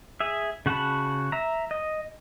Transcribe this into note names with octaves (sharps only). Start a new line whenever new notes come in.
G#4 E5
C#3 F#4 F#5 A5 B5
E5 A#5
D#5